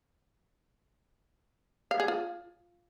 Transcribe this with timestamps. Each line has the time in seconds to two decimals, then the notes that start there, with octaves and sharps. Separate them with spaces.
1.91 F5
2.00 G#4
2.08 F4